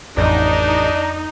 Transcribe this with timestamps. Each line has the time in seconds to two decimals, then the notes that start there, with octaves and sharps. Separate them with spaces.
0.17 A1 F2 D4 D#4